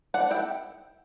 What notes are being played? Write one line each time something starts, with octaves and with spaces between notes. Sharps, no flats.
C4 D5 F#5
E4 E5 G5